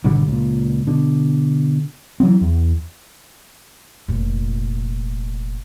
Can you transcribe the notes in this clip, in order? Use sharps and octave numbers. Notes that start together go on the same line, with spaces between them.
G#1 B2 D3 G3
C#2 A#2
B2 D3
E3 F#3 B3 C4
E2
F1 A#2